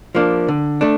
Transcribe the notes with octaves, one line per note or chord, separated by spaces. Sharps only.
F3 A#3 D4
D3
A3 D4